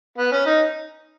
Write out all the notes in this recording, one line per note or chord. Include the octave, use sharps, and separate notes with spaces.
B3
C#4
D#4